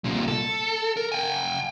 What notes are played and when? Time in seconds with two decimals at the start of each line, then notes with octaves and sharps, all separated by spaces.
0.04 C2 A#2
0.28 A4
0.97 A#4
1.12 G5 G#5